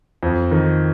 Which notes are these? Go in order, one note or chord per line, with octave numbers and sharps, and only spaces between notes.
F2
D#3